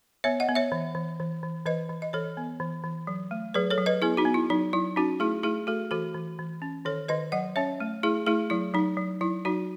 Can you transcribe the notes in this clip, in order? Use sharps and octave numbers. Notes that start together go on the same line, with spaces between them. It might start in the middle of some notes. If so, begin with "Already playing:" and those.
B3 C#5 E5
D#5 F#5
B3
C#5 E5
E3
E3
E3
E3
E3 B4 D#5
E3
D#5
E3 A4 C#5
B3
E3
E3
F#3
A3
F#3 G#4 B4
A4 C#5
F#3
B4 D#5
B3 E4 G#4
D#4 F#4
B3
E4
F#3 D#4
F#3 E4
C#4 D#4 F#4
A3 E4 G#4
A3 E4 G#4
A3 F#4 A4
E3 F#4 A4
E3
E3
C#4
D#3 A4 C#5
D#3 B4 D#5
F#3 D#5 F#5
C#4 C#5 E5
A3
A3 E4 G#4
A3 E4 G#4
F#3 E4
F#3 D#4
F#3
F#3 E4
F#3 D#4 F#4